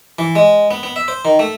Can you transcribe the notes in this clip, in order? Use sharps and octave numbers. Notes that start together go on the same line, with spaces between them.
E3
G#3
B3
B3
E5
C5
D#3
A3